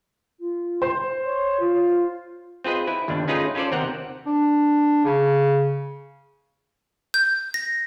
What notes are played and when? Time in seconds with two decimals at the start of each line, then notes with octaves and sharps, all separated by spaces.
0.40 F4
0.82 C5
1.25 C#5
1.60 F4
2.64 C4 F4 G#4 B4 D#5
2.87 E4 B4
3.08 G1 D#2 G3 D4
3.28 A3 C#4 D#4 F4 G#4 B4
3.55 C#4 F4 A4 C5 D5
3.71 D#2 C3 C4 A#4 F#5
4.27 D4
5.05 C#3
7.14 G6
7.54 A#6